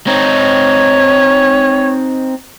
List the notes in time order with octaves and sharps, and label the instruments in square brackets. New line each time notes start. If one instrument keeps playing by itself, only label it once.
[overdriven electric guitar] C4 D#4 [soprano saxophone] C#5